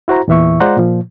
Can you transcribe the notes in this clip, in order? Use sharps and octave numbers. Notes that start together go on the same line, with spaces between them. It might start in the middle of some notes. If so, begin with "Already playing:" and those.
E4 F#4 C5 A#5
E2 A#2 E3 E5 C#6
G#3 F4 C5 D5 F#5 A#5
A#2 F3